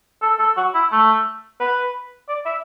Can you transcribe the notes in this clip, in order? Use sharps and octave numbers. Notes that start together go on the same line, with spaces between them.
A4
A4
F#4
E4
A3
B4
D5
E5